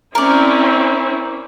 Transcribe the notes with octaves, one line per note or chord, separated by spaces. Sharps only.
C4 C#4 E4 A#4 D5